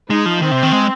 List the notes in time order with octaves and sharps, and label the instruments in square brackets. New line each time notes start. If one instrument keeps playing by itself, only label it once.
[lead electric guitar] G#3 [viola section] D#4
[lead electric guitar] F3
[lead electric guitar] D#3 [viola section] C4
[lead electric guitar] C3
D#3
G#3